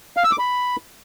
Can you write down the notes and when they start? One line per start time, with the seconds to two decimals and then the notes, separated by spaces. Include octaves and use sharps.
0.17 F5
0.24 E6
0.31 D6
0.39 B5